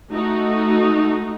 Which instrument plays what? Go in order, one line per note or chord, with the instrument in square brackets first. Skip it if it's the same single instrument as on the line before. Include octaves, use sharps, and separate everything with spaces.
[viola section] A3 D#4 F#4